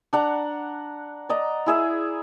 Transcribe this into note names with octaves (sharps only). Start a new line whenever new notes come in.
D4 F#5 A#5
D5 D#5 A#5
E4 G#4 E5